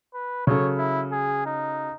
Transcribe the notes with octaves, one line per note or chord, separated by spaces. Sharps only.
B4
C#3 F#3 A4 C#5
E4
G#4
D#4